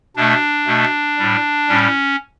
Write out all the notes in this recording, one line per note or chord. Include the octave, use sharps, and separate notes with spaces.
B2 A3 D4
B2 A3
A2 G3
A2 G3 C#4